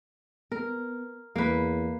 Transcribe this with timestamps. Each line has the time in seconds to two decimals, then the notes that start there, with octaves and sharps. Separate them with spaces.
0.52 B3 A#4
1.36 E2 A#3 B4